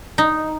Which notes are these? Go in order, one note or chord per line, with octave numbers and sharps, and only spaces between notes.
D#4